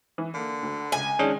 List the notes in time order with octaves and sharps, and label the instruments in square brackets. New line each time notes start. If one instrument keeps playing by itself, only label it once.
[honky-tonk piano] E3
[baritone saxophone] D3 [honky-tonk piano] A#3
[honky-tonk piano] D2
[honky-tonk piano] C#2 [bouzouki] G#5
[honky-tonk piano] D#3 G#3 [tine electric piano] C#4 D4 G#4